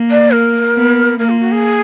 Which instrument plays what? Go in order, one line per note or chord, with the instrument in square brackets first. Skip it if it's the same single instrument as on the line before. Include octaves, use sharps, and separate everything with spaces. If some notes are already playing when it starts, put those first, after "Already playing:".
Already playing: [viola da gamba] A#3
[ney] D5
A#4
[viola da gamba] B3
[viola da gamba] A#3 [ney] A#4
[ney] F4
F#4
G#4